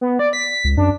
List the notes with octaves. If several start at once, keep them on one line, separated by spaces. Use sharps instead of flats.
B3
D5
B6
C#2
F#2 D4